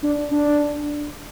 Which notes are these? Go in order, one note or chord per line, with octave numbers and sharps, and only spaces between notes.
D4
D4